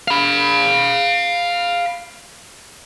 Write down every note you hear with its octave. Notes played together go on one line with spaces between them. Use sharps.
F5 B5